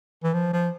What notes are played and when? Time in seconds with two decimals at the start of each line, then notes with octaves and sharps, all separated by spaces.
0.24 E3
0.34 F3
0.53 F3